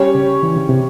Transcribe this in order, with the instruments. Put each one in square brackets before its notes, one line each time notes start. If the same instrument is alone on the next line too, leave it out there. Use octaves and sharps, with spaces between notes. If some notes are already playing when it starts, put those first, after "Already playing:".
Already playing: [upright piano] G3 C#4 G4 C#5
[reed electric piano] C#3
E3
C#3
C3